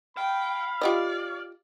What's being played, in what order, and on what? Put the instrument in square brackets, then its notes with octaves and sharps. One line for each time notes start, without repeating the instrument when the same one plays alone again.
[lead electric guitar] F5 [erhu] G5 [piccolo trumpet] B5
[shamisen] F4 G4 D#5 [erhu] D5